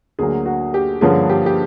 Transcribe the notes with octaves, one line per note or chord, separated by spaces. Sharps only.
D2 D3 F#3 A#3 G#4
F#4
G4
G2 D3 F3 A#3 C#4 G#4
G4
G4